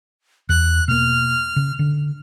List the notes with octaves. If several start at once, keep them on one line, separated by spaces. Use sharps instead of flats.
E2 F#6
B2 A#3 F6
C#3
D3